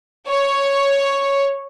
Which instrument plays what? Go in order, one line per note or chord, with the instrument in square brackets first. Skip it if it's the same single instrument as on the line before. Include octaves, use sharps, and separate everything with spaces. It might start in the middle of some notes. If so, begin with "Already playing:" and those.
[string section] C#5